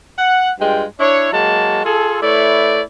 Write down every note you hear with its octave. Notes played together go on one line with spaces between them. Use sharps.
F#5
G2 G#3 F4 G5
D4 E4 C#5
F#3 G#3 A#3 F#4 A5
F4 G#4 A4
A3 E4 B4 C#5 D5